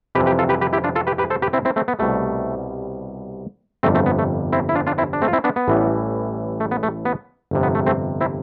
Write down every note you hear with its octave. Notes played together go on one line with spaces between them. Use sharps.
F2 C3 E3 G3 G4 B4
G4 B4
F4 A4
G4 B4
G4 B4
E4 G4
D4 F4
F4 A4
G4 B4
G4 B4
A4 C5
G4 B4
C4 E4
C4 E4
A3 C4
B3
C2 B2 G3 A3
G1 F2 C3 G3 A3 C4
A3 C4
B3
A3
C4 E4
E4
D4 F4
D4 F4
C4 E4
D4
A3 C4
F4
C4 E4
B3 D4
B3
A1 A2 E3 G3
A3
B3
A3
B3
G1 F2 C3
B3
A3
A3 C4
C4 E4